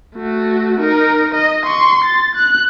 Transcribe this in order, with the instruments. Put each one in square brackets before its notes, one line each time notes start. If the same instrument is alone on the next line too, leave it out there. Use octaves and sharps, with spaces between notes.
[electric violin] A3 F#4
D#4 A#4
D#5
C6 C#6
A6
F#6